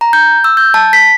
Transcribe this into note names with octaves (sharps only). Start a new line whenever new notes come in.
A#5
G6
E6
G6
A5
B6